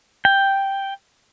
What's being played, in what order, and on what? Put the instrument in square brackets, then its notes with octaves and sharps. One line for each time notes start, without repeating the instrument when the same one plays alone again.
[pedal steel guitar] G5